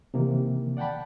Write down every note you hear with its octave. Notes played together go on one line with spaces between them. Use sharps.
C3 D#3 E3 A#3
D5 F#5 G5 A5 B5